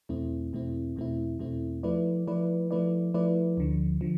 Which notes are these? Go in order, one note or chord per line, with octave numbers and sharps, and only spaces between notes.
E2 B2 A3 C4 E4
E2 B2 A3 C4 E4
E2 B2 A3 C4 E4
E2 B2 A3 C4 E4
F3 A3 E4 B4 D5
F3 A3 E4 B4 D5
F3 A3 E4 B4 D5
F3 A3 E4 B4 D5
D2 D3 F3
D3 F3